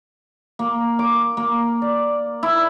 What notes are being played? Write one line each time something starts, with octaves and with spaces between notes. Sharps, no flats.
A#3
D6
A#3
D5
E4